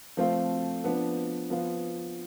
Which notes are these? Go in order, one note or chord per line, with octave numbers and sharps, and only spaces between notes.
F3 A3 C4 F4 A4
F3 B3 D4
F3 B3 F4